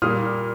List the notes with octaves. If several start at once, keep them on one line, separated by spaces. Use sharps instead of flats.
A#2 G3 A#3 D#6 F6